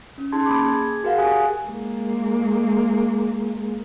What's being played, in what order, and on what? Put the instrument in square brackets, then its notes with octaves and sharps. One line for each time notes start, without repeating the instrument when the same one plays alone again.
[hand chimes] C#4
C#4 D#4 G#4 A5 C6 G#6
A#3 B5 D6
G#4 G#6
F#4 G#4 A#4 F5 F#5
G4 G#5 D#6 F#6
[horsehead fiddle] G#3 A#3